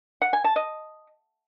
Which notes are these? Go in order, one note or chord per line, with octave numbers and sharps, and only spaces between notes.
F#5
G#5
A5
D#5